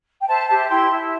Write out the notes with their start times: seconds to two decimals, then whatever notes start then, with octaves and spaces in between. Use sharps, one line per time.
0.21 G5
0.27 C5 E5 A5
0.48 G4 E5 A5
0.69 E4 G5 C6
0.89 E4 E5